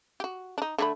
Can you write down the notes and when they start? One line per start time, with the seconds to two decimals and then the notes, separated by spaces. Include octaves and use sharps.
0.20 F#4 G4
0.58 D4 D#4
0.78 D3 A3 B5